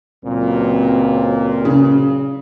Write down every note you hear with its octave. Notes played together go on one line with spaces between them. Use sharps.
C#2 A#2 F#3 C4
C#3